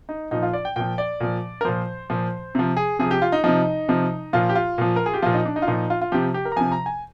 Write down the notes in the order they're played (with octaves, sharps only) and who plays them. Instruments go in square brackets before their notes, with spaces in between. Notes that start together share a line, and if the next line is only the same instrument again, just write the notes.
[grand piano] D#4
A#2 F3 D#4
F4
D5
G5
A#2 F3 G5
D5
A#2 F3
A#4
A#2 F3 C5
A#2 F3
C3 F3
G#4
C3 F3 G#4
G4
F4
D#4
C3 F3 D#4
C3 F3
A#2 F3 F4
G4
F4
A#2 F3
A#4
G#4
G4
A#2 F3 F4
D#4
D4
D#4
F4
A#2 F3 D#4
F4
F4
C3 F3 G4
G4
A#4
A#5
C3 F3 G#5
A#5
G#5